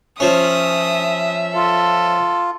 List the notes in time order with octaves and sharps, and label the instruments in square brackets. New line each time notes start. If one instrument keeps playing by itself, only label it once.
[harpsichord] F3 C#4 [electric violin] E5 [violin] D#6
[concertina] F4 [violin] A4